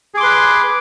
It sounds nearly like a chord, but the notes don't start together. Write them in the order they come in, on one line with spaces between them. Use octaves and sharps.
G#4 D6 C6 B4